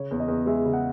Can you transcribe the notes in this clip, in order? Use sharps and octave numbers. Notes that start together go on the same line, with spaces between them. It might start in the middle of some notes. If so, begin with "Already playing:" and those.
Already playing: C#3 C#5
E2
D#5
E2
G#3 E5
C#3
F#5